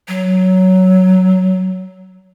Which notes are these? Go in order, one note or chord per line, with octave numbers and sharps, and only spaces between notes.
F#3